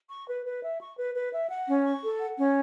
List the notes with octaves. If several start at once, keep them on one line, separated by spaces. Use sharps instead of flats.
C#6
B4
B4
E5
C#6
B4
B4
E5
F#5
C#4
C#6
A4
F#5
C#4